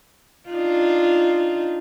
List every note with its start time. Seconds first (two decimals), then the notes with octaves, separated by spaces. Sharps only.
0.49 D4 D#4 F4